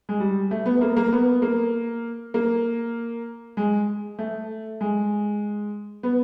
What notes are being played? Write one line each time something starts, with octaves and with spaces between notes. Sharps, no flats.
G#3
G3
A3
B3
A#3
A#3
B3
A#3
A#3
G#3
A3
G#3
B3